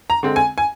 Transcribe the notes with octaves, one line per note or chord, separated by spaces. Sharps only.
A#5
D3 G#3 C4
G#5
G#5